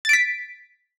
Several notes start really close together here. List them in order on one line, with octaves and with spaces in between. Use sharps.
A6 D7 B6